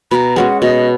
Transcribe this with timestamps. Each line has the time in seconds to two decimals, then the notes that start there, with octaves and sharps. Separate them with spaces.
0.11 B2 A#5 B5
0.36 G#3 C#4 F#4 F#5
0.61 B2 D#5